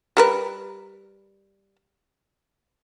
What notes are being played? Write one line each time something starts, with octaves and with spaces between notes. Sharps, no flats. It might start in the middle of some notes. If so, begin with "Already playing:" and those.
G3 A#4 B4